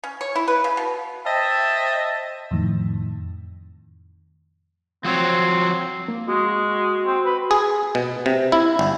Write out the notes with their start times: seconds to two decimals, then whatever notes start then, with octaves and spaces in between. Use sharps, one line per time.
0.04 C#4
0.21 C#5
0.36 E4
0.48 B4
0.64 C#3
0.77 B2
1.26 C5 D#5 E5 G5 A5
2.51 F2 A2 D#3
5.05 F3 C4 F#4 C#5
6.08 A#3
6.28 G#3 F#4
7.05 C4
7.26 B4
7.51 G#4
7.95 B2
8.26 C3
8.52 E4
8.79 G1